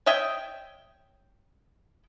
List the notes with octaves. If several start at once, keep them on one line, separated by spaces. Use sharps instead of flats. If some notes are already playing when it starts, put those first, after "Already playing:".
C#5 D#5 E5 G5